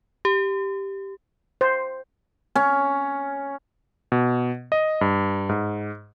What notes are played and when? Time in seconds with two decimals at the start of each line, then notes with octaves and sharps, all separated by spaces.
0.25 G4
1.61 C5
2.56 C#4
4.12 B2
4.72 D#5
5.01 G2
5.49 G#2